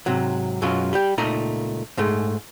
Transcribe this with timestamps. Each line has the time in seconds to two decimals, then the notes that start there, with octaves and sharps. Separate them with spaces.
0.06 G#2 C3 F#3
0.62 F#2 B2 F#3 G#3 C#4 F4
0.93 G3 G4
1.18 C#2 A#2 A3 D#4 A#5
1.97 G#2 G#3 A3